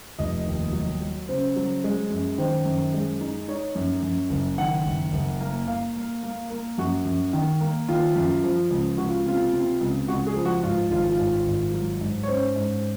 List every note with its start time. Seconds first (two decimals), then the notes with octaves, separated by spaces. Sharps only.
0.19 F1 D#5
0.46 D#2
0.73 F#3
1.01 F#3
1.28 C#3 C5
1.56 F#3
1.84 G#3
2.10 F#2
2.38 D#3 C5
2.66 F#2
2.94 G#3
3.21 D#4
3.48 D#4 C#5
3.75 F#2
4.03 F#2
4.30 F#1
4.58 D#3 F#5
4.86 F#1
5.13 F#1
5.41 A#3
5.68 A#3 F5
5.96 A#3
6.23 A#3
6.50 A#3
6.78 F#2 F#4
7.05 F#2
7.33 D#3
7.61 A#3
7.88 D#3 F4
8.16 F#2
8.44 F3
8.70 C#2
8.98 C#2 F#4
9.09 F4
9.26 C3 F4
9.53 C3
9.81 C#2
10.08 C#2 F#4
10.27 G#4
10.36 F3
10.45 F#4
10.63 G#2 F4
10.90 G#1 F4
11.10 F4
11.18 G#2
11.46 G#1
11.73 F#3
12.01 G#2
12.23 C#5
12.28 C#4 C5
12.56 G#2